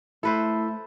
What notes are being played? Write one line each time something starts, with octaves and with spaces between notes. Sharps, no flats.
A3 E4 A4 B4 C5 E5